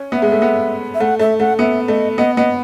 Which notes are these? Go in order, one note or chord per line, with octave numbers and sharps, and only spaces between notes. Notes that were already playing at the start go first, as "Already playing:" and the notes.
Already playing: C#4
B3 E5
G#3
A3
B3
E5
A3 F#5
A3 E5
A3 F#5
B3 E5
A3 D#5
B3 D#5
B3 D#5